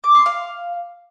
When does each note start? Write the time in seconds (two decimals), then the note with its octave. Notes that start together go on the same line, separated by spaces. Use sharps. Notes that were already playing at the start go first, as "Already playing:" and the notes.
0.04 D6
0.15 C6
0.26 F5